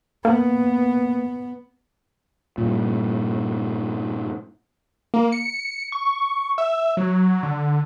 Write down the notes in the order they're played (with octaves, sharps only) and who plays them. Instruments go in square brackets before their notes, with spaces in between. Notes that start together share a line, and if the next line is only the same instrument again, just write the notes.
[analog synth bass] A#3 [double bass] B3
[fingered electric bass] G2 A#2
[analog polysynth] A#3
C#7
C#6
E5
F#3
D3